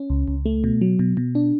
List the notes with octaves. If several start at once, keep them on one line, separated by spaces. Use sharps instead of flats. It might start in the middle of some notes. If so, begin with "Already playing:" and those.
Already playing: C#4
C#2
C#2
A3
B2
F#3
B2
B2
D4